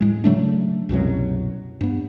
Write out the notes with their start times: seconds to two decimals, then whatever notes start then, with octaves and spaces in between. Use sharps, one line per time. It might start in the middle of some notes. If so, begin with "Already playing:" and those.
0.01 A2 G#3
0.24 C#3 F#3 A3 D4
0.89 C2 F#2 B2 F#3
1.81 G2 B3